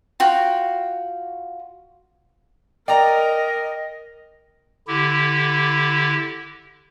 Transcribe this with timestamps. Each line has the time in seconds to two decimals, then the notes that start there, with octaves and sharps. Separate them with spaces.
0.20 F4 F#4 G5
2.88 A#4 D5 D#5 G5 A#5
4.88 D3 E4 G4